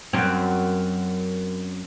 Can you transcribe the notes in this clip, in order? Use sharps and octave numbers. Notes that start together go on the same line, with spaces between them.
F#2 C4